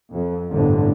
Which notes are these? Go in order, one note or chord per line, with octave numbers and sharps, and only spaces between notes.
F2
G1 C2 F2 A2 D3